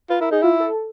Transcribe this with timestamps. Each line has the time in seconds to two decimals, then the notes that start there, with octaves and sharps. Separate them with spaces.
0.10 F4 B4
0.21 E4 A#4
0.31 D#4 G#4
0.42 E4 F4
0.60 A4